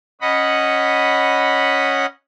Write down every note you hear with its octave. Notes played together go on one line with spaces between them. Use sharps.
C#4 D#5 F#5 B5